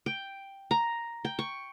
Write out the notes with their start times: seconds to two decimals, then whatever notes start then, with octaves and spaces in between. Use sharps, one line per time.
0.06 G5
0.71 A#5
1.25 G5
1.39 C#6